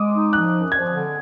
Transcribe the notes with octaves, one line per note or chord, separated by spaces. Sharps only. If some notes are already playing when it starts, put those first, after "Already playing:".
Already playing: G#3 D6 D#6
D#4
F3 F#6
F#2
F3 G#6
D3